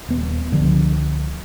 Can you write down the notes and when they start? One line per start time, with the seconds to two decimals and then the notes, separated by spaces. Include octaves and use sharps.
0.08 D#1 B3
0.52 C#2 D3 F3 D4